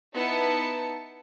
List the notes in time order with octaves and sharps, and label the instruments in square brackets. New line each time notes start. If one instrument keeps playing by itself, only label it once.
[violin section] B3 D#4 E4 A5 C#7